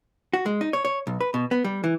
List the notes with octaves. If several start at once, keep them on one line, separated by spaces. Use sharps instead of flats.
F#4
G#3
D#4
C#5
C#5
B1
B4
B2
B3
G3
E3